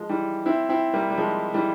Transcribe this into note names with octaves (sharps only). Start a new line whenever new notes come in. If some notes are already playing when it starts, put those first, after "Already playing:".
Already playing: F3 G#3
E3 G3
C4 E4
C4 E4
G3 A#3
G3
F3 G#3
E3 G3